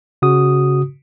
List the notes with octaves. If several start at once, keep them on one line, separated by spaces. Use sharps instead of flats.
C#3 F#4 D#6